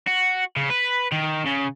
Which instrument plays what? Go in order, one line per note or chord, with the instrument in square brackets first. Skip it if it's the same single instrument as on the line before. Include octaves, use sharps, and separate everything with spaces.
[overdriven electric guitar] F#4
C#3
B4
D#3
C#3